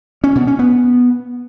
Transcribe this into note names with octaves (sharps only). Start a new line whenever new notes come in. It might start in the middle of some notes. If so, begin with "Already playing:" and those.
C#4
B2
C#4
B3